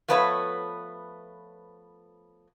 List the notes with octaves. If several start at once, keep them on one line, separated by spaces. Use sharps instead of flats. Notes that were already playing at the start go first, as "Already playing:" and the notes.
F3 A3 B3 B4 C#5 E5